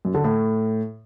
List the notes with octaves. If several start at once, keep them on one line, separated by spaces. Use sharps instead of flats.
F#2
D3
A2